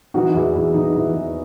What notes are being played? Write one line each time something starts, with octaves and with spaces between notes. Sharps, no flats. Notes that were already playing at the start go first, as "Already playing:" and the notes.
E3 D#4 F#4
E2 E4
E2 E4
E3 D#4
E3 E4
E2 E4